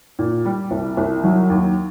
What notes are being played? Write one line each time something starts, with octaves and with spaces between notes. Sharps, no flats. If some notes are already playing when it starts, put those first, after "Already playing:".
A#2
G3
C2
C2
F#3
D#2